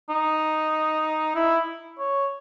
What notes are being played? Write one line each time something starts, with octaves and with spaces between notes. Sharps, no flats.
D#4
E4
C#5